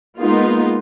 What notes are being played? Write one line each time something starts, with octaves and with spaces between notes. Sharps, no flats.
G#3 A#3 B3 D#4 F4